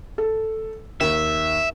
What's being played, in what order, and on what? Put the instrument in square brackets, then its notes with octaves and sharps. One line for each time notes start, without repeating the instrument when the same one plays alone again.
[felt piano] A4
[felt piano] D#2 [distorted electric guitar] E5